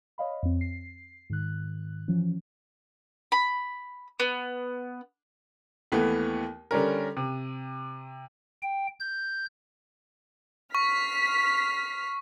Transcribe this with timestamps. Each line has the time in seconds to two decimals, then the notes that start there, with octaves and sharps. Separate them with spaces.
0.18 C#5 D#5 F5 B5
0.43 F2 C4
0.61 C7
1.30 G#2 D#3 F#6
2.08 E3 F3 C#4
3.32 B5
4.20 B3
5.92 D#2 E3 A3 B3
6.71 D3 G3 C#4 A#4
7.17 C3
8.63 G5
9.00 G6
10.75 C#6 F6 B6 C7